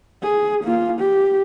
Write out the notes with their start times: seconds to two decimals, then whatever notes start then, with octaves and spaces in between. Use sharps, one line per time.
0.23 G#4
0.63 A#3 F4
0.99 G4